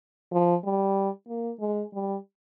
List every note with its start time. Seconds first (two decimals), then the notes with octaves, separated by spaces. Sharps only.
0.33 F3
0.64 G3
1.28 A#3
1.60 G#3
1.93 G3